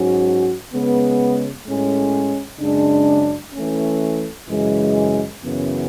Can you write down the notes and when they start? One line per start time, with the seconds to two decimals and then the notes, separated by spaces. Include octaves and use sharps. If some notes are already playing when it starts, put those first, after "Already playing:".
Already playing: G#2 F#3 C#4 F#4
0.71 C#3 G#3 B3
1.65 A2 G#3 C#4
2.59 F#2 C#3 G#3 D4
3.54 E3 A3 C#4
4.48 F#2 C#3 E3 G#3
5.42 F#2 C#3 E3 B3